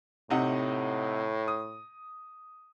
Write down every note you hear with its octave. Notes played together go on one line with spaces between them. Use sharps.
A2 C3 D#4 F#5
D#6